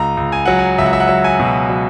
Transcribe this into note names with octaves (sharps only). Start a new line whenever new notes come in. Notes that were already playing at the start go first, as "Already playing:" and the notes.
Already playing: C#2 A#5
C#2
G#5
F#3 F#5
G#5
C#2 E5
F#5
E5
F#5
F#3 E5
G#5
B2
F#3